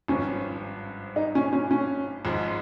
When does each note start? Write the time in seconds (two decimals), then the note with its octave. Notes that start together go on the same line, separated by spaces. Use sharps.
0.08 G#1 G2 F3 C#4
1.16 D#4
1.35 C#4
1.53 C#4
1.71 C#4
2.25 G#1 G#2 F3 G#3